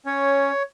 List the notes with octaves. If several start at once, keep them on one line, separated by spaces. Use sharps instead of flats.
C#4 C#5